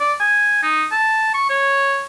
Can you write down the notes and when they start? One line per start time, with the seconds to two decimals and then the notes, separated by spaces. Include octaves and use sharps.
0.01 D5
0.20 G#5
0.63 D#4
0.92 A5
1.34 C#6
1.50 C#5